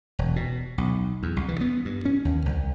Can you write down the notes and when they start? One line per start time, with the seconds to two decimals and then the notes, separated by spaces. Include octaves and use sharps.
0.19 E1
0.36 B2
0.78 B1
1.23 E2
1.36 C2
1.48 E3
1.61 B3
1.85 G2
2.05 C#4
2.25 D#2
2.46 C2